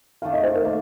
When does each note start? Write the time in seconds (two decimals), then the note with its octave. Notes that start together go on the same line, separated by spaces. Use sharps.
0.22 D#3 A3 D4 F5
0.33 D#5
0.43 C5
0.55 A#4
0.65 A#3 A#4